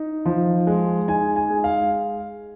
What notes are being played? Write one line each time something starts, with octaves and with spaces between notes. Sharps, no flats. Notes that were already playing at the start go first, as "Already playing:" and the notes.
Already playing: D#4
F3
G#3
D#4 G#5
G#5
G#3
F5